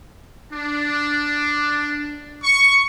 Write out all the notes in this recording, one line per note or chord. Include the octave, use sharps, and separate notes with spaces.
D4
C#6